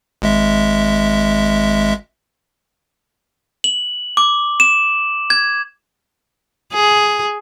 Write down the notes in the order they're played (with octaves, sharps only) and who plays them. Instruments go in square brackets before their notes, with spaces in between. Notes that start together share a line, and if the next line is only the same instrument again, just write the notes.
[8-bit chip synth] G#1 G#3 E5
[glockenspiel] F#7
D6
E7
G#6
[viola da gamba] G#4